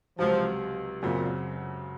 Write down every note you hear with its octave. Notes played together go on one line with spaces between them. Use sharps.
C#2 C3 F3 F#3
F#2 A#2 C#3 F#3 C4